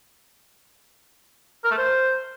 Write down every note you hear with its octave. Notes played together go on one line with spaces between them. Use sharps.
A#4
A3
C5